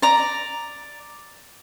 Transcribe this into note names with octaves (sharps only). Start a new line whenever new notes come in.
D5 A#5